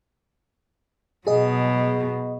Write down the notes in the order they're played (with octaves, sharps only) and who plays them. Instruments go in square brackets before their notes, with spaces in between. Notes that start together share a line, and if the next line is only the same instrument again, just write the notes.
[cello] B2 F#3 [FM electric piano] G#4 D#5